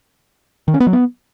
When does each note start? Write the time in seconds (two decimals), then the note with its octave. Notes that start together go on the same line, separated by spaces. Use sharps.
0.68 D#3
0.74 C#4
0.80 B3
0.87 F#3
0.93 B3